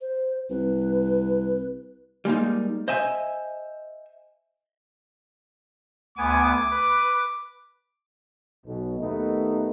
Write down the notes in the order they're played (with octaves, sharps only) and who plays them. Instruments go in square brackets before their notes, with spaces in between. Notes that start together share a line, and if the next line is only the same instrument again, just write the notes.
[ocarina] C5
[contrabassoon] C2 [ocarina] B4
[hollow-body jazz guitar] G3 G#3 A#3 D#4
C5 D#5 E5 G#5
[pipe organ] D2 B3 G#5 [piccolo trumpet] D6
[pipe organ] B4
[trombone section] B1 B2
D#2 A3 B3 D#4